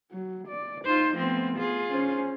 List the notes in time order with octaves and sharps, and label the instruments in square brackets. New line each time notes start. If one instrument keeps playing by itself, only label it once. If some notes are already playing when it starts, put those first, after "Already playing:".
[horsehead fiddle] F#3
D5
[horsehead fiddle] D#4 [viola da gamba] F4 C5
[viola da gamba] F3 C4 [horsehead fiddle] A3 B3
[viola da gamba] F4 G#4
[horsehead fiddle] C#4 C5